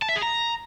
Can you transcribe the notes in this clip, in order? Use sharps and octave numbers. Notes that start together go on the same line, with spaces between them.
A5
E5
G#4
A#5